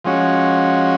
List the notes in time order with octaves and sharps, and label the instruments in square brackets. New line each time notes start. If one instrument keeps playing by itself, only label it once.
[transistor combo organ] F3 G#3 C#4 F#4